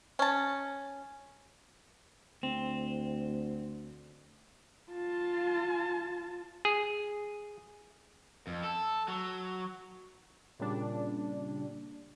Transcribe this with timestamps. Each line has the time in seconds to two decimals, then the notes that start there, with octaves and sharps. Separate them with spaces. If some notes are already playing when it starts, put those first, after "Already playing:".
0.19 C#4 A5
2.43 D2 C4
4.92 F4 A5
6.65 G#4
8.47 F2
8.64 A4
9.08 F#3
10.59 A#2 C#3 G3 D4